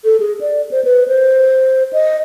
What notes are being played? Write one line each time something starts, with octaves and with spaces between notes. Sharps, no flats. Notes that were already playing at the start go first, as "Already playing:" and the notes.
A4
G#4
D5
C5
B4
C5
D#5